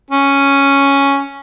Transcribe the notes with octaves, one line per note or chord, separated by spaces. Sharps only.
C#4